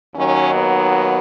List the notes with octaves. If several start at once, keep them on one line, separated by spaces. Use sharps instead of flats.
D#2 D#3 F#3 C#4
B3